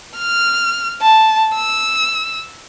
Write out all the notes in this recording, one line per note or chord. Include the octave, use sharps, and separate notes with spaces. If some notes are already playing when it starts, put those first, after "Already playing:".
F6
A5
E6